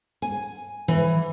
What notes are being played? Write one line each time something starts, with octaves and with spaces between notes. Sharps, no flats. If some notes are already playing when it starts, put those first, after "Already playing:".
G#5
E3